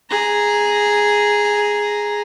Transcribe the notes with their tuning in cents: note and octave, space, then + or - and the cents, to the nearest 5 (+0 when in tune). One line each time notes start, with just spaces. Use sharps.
G#4 +0 A#5 +0